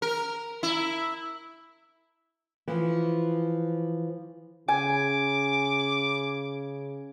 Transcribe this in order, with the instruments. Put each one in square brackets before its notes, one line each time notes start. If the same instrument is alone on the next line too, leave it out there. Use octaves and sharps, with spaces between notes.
[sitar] A#4
E4
[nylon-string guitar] E3 F3
[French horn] C#3 [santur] G#5 [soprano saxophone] D6